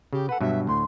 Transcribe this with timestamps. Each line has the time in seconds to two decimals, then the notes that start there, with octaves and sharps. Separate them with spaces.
0.13 C#3 G4
0.29 A4 B4 F#5
0.41 G2 B2 F#3 E5
0.67 D2 A2 C6